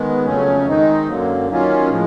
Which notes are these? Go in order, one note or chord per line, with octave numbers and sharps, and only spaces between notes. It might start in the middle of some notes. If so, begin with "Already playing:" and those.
Already playing: D#3 G#3 B3
F2 C#3 F#3 A3 C#4
D#3 G#3 C4 D#4
F#2 D3 F#3 A#3
D#3 F#3 A#3 C#4 F4
A2 F3 G#3